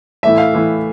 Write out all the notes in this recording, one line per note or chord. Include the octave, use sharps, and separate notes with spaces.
A2 E3 A3 E5
F5
A2 E3 A3